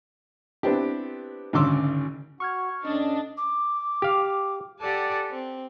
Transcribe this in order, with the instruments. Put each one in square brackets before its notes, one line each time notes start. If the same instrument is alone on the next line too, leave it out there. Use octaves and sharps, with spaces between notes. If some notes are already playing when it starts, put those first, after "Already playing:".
[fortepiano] B3 C4 D4 E4 G4
G#1 D2 C#3 C6 D6 E6
[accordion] F#4 [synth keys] C#6 F6 G#6
[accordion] A2 D#5 [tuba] C#4 [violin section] D4
[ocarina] D6
[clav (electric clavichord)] G4 F5
[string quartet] G4 A4 D5 F#5 G#5 A5
C4